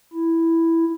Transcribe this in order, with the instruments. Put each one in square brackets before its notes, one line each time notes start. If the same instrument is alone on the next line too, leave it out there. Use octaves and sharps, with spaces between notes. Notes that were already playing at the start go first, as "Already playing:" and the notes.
[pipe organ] E4